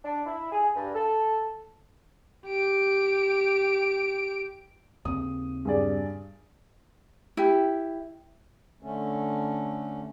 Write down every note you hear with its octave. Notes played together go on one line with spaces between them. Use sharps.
D4
E4
G#4
G2
A4
G4 D7
D#2 C#3 C4 D#6
G2 G#4 D5
E4 G4
D3 A3 C#4